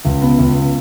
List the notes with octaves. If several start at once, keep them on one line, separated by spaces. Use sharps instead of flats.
C#2
B3
C#2